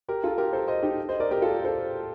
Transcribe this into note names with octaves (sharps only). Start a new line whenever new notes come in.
G4 A#4
F4 A4
G4 A#4
A4 C5
C5 D#5
D#4 G4
C5 D#5
A#4 D5
G4 A#4
F4 A4
A4 C5